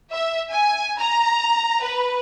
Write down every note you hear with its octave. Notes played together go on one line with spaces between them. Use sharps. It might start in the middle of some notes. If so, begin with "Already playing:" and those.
E5
G#5
A#5
B4